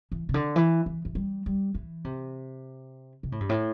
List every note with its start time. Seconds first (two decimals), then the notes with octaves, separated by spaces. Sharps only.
0.12 E3
0.29 C3
0.34 D3
0.56 E3
0.86 E3
1.05 E3
1.15 G3
1.46 G3
1.75 E3
2.04 C3
3.23 C3
3.32 A2
3.40 G2
3.49 A2